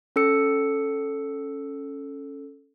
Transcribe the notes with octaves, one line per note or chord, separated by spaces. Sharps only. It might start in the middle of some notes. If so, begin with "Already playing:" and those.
C#4 A4 E6 C#7